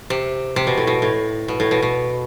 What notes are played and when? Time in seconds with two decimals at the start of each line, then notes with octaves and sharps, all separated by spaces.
0.10 C3
0.56 C3
0.67 B2
0.78 A2
0.87 B2
1.02 A2
1.48 B2
1.60 A2
1.71 B2
1.82 B2